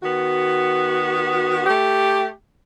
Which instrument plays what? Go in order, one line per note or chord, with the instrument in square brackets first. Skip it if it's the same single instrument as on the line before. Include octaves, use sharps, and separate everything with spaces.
[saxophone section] D#3 B3 F#4
A3 G4